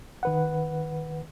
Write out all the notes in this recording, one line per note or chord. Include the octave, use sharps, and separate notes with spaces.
D#3 B4 F#5